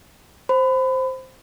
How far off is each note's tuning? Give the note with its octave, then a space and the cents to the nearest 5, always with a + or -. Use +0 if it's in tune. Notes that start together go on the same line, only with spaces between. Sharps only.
C5 +0 B5 +30